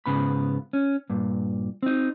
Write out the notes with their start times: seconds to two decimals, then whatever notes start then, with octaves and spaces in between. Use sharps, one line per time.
0.06 G#2 C#3 B3 B5
0.73 C#4
1.10 G2 A#2
1.83 C4 D#4